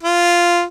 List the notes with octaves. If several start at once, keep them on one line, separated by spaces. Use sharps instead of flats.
F4